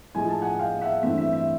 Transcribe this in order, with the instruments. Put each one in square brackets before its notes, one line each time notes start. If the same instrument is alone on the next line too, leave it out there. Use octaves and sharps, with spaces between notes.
[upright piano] A2 F3 G#3 G#5
A5
F#5 G#5
F5 G5
E5 F#5
G2 E3 A3 C4 E5
E5
E5